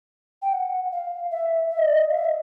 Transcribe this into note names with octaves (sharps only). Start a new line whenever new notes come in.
G5
F#5
F5
E5
E5
D#5
D5
D#5
F5
E5
D#5